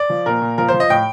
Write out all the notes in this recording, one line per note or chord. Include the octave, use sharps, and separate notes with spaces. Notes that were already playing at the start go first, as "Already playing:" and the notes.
Already playing: D5
F3
A#2 A#4
A#2
F3 A#4
C5
F3
D#5
A2 G5